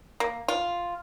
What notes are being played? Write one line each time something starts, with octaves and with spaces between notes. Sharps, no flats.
A#3
F4